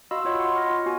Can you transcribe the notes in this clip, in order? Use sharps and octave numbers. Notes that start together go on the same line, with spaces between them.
F#4 D#5 F5 B5 C6 E6
F4 F#4 C#5 D#5 F#5 B5
F#5 C6 C#6
F6 A#6
F4
B3 F#4 G#5